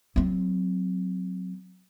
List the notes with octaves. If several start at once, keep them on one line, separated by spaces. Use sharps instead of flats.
F#3 C4